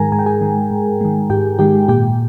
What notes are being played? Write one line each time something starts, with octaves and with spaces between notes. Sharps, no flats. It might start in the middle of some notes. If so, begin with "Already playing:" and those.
Already playing: G#2 D#3 G#3 G#4 A#4 G#5 A#5
G#2 G#5
G5
G#4 G#5
D#3 G#3
G#2
D#3 G#3
G#2 G4 G5
D#3 G#3 G4 G5
A#2 G4 G5